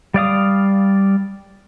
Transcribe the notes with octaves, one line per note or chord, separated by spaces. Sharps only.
G3 D5 F5 D#6